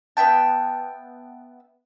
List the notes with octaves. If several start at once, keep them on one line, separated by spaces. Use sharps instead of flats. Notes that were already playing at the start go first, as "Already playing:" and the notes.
B3 E5 G5 A5